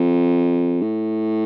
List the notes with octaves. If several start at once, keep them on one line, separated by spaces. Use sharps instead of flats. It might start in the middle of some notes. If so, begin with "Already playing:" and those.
Already playing: F2
A2